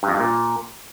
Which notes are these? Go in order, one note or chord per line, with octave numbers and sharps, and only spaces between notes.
G2
F2
G2
A#2